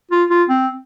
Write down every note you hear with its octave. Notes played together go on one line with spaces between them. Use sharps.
F4
F4
C4